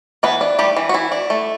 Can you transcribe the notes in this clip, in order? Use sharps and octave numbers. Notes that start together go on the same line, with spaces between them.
E3 B3 B4
D4
G3 A3 G4
E3
F#4
E3 E4
D4
A3